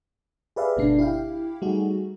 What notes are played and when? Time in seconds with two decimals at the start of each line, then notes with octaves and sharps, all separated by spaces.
0.56 G4 G#4 B4 D5 E5 F5
0.76 G1 B2 A3 D4 C7
0.99 E4 G4 F5 G5
1.62 G3 A3 D#4 F#4 G#4